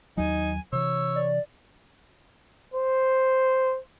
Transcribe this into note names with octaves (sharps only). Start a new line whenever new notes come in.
D#2 F#3 D#4 G#5
C3 E3 C#5 E6
D5
C5